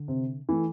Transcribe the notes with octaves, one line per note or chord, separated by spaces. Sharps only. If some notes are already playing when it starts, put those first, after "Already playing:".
Already playing: D3
C3
E3 A3